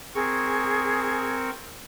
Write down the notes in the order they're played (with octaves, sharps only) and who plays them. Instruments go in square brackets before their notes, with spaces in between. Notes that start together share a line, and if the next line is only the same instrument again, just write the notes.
[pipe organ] C4 A#4 C#6 [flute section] G#4